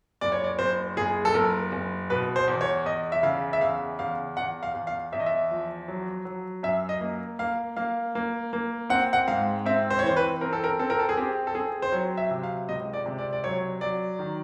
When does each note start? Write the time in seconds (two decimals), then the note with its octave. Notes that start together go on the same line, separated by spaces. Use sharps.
0.21 F#1 D5
0.32 C#5
0.44 D5
0.59 F#1 C5
0.97 F#1 G#4
1.25 A4
1.34 F#1 A#4
1.72 F#1
2.10 B2 B4
2.36 C5
2.48 E2
2.61 C#5
2.85 E2 D#5
3.12 E5
3.23 C#3 F5
3.53 E5
3.61 E2 F5
3.99 E2 F5
4.37 E2 F#5
4.63 F5
4.74 E2
4.87 F5
5.13 E2 E5
5.20 D#5
5.26 E5
5.50 F3
5.88 F#3
6.25 F#3
6.63 F#2 E5
6.89 D#5
7.01 A#3
7.39 A#3 F5
7.76 A#3 F5
8.15 A#3
8.53 A#3
8.90 C4 F#5
9.13 F#5
9.28 G#2 F5
9.66 C4 E5
9.90 C5
9.99 C#5
10.03 E3 C5
10.16 B4
10.41 C4 A#4
10.53 A4
10.64 A#4
10.79 C4 A4
10.90 A#4
10.99 A4
11.09 G#4
11.17 C4 G4
11.47 A4
11.54 C4 G#4
11.82 C5
11.92 F#3 C#5
12.17 E5
12.31 C3
12.43 F5
12.69 C#2 D#5
12.93 D5
13.06 C3
13.18 D5
13.33 D5
13.44 F#3 C#5
13.81 F#3 D5
14.19 D#3